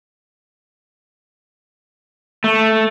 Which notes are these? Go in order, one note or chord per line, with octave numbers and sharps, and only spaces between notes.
A3